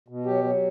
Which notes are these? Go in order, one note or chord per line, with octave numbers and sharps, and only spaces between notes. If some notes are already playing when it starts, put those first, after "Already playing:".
B2
F#3 G4
F#3